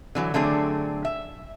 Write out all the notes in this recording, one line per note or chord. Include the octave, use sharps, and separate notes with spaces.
D3 E3 F#3
D3 F#3 A3 C4 D4 G#4
E5